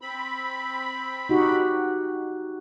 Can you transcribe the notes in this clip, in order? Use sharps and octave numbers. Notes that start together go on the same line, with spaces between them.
C4 B5
D#4 F#4 G4